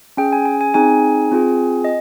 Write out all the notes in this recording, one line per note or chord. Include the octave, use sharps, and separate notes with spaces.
C#4 G#4 G5
G#5
G#5
G#5
C4 D#4 G#4 G#5
C4 F4 G#4
D#5